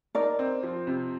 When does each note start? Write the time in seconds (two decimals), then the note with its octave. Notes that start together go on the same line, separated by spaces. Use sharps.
0.15 D#4 A#4 D5
0.39 C4
0.63 F3
0.87 C3